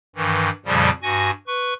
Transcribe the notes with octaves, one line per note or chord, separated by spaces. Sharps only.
G2 D#3 E3
F2 A#2 C#3 F3 G3
G2 F#4 G#5 C#6 A#6
B4 C#6